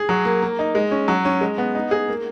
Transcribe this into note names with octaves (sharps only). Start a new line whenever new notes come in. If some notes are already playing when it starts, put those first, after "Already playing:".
Already playing: G#4
F#3
A#3
A#3
D#4
G#3
C#4
F#3
C#4
G#3
B3
D#4
G#4
A#3